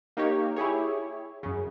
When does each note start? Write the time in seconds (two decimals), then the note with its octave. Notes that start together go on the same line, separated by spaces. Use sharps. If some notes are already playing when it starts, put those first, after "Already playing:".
0.17 A#3 D#4 G4 C#5
0.56 E4 G4 G#4 C#5
1.43 F#2 C#3